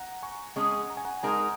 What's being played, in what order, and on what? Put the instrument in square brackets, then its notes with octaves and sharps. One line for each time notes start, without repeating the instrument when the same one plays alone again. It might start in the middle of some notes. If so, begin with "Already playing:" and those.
Already playing: [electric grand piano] F#5 A#5
G#5 C#6
[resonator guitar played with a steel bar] G#3 C#4 G#4 [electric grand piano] G#5 C#6
[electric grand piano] A#5
G#5
F#5 A#5
[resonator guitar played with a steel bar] G#3 D#4 A#4 [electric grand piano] G#5
[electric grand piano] F#5